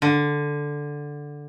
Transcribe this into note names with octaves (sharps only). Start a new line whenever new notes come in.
D3